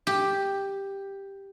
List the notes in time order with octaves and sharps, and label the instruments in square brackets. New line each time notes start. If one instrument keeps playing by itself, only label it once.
[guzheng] G4